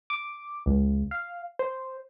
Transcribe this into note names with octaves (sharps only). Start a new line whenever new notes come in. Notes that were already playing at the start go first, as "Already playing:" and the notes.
D6
C#2
F5
C5